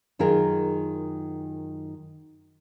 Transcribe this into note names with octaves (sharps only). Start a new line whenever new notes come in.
F#2 D#3 F4 G#4 A#4